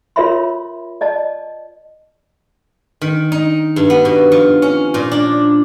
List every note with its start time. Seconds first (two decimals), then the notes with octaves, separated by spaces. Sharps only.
0.16 F4 A#4 C#5 E5 B5 C6
1.01 D5 D#5 A5
3.01 D#3
3.32 D#4
3.76 G2
3.90 B3
4.05 B2
4.32 F3
4.62 C#4
4.94 A#2
5.11 D4